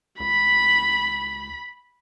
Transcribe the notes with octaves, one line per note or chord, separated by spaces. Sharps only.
C#2 B5